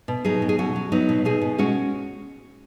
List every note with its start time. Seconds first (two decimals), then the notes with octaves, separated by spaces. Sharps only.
0.08 B2
0.25 F#3 D#4 G#4
0.42 B2
0.49 G#4
0.58 F#3 C#4 F#4
0.76 F#3
0.92 F#3 B3 D#4
1.09 B2
1.25 B2 D#4 G#4
1.42 B2
1.58 G#3 C#4 F#4